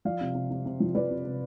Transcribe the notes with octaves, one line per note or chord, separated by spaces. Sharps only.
F3 D5 F5
C3
C3
C3
C3
F3
F3 B4 D5
C3
C3